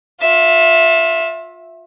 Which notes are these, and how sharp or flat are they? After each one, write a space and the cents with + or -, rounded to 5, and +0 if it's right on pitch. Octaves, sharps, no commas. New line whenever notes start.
F4 +30 E5 +0